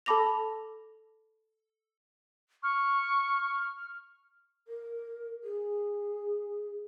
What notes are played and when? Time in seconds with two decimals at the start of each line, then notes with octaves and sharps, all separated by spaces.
0.06 A4 A5 B5 D6 A#6 F7
2.63 C#6 F6
4.68 A#4
5.43 G#4